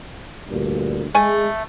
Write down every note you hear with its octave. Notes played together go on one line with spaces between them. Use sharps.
D2 G2 A#2
G#3 A3 G#5